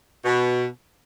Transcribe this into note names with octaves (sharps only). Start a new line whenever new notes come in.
B2